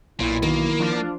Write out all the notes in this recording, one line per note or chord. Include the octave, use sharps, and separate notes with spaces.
B1 A#2 E4
D#3 A#3
F3 D4 F4